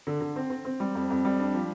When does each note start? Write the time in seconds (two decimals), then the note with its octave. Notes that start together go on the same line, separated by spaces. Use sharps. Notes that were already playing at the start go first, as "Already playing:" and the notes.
0.07 D3
0.21 D3
0.36 C4
0.50 C4
0.65 C4
0.80 G3
0.95 F2
1.10 F2
1.25 G3
1.40 D4
1.54 F3